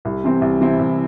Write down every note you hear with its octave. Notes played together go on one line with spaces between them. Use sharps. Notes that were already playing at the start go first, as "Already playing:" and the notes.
C2
C3 E3 C4 E4
C2
C3 E3 C4 E4
C2